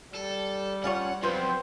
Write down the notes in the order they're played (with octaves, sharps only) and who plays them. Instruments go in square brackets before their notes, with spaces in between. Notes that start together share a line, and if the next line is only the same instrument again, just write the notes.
[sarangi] G3 [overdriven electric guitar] A4
[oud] C#4 F4 C#5 [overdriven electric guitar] F#5
[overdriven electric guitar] F2 F#3 [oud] B3 C4 F4 [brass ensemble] C5